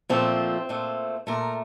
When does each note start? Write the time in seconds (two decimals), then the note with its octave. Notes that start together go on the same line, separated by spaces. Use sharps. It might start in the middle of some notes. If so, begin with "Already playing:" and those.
0.09 A#2 F3 A3 C4
0.69 A#2 A3
1.27 A#2 A3 A#4